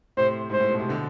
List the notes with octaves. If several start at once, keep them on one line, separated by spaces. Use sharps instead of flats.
A2 C3 C5
G#2 C5
A2
B2
C3
B2 D3